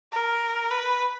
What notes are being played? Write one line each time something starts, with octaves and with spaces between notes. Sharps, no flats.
A#4
B4